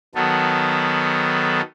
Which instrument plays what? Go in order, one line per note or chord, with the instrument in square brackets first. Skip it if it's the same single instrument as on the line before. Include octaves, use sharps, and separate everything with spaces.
[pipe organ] D#3 F#3 B3 A4